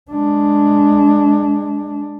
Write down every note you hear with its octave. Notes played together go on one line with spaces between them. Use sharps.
G#3 D4